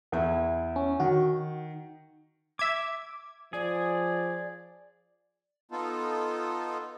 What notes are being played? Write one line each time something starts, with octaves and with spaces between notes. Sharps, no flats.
E2 E4
C#4
D#3 F#4
E5 D6 G#6
F3 G#4 D5
B3 D#4 F4 A4